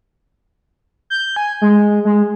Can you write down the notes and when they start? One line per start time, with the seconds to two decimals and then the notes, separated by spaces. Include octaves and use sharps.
1.10 G6
1.36 G#5
1.62 G#3
2.05 G#3